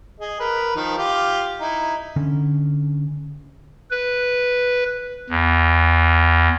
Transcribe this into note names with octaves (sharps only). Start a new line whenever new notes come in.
G#4 D#5
A#4 B4
D#3 F3
F4 G4
D#4 E4
D3 C#4
B4
E2